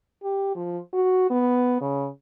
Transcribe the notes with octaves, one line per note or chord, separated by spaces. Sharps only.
G4
F3
F#4
B3
C#3